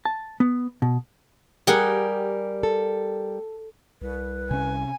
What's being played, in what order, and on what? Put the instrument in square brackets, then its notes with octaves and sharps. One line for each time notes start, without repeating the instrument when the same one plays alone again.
[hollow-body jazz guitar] A5
B3
B2
[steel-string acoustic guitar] G3 A#4 [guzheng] G4 G#4 F#5
[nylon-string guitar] A4
[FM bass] C2 [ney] B4
[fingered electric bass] C3 C#4 [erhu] G#5